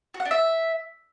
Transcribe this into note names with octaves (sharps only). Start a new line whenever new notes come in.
F#4
F#5
D4
E5